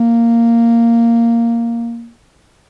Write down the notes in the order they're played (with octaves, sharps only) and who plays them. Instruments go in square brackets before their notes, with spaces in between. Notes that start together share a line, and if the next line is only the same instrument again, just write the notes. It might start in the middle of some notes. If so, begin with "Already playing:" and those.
Already playing: [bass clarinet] A#3